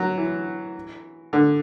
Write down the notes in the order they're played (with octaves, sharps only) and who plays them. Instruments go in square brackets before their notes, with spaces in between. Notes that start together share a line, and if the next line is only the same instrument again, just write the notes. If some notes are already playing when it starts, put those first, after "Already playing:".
Already playing: [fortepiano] F#3
E3
D3